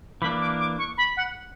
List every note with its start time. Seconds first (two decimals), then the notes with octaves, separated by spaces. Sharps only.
0.21 E3 A#3 D4 B5
0.41 D6
0.59 D6
0.79 C#6
0.98 B5
1.17 F#5